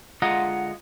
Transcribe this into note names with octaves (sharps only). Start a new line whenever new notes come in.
D3 G#3 F4 D#5 F#5 A#5